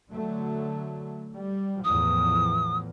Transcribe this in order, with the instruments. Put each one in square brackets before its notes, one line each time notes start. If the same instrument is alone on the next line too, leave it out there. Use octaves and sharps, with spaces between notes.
[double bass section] D3 F#3 A3
G3
[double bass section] E2 A2 F3 [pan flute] D#6